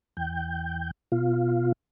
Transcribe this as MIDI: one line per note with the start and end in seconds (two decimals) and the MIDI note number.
0.17 0.91 40
0.17 0.91 79
1.12 1.72 47
1.12 1.72 65